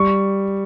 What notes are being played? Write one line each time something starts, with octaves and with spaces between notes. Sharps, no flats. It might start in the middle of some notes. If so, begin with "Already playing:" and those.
Already playing: G3 C#6